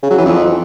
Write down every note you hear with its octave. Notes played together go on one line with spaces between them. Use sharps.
C#3
F#3
E3
F2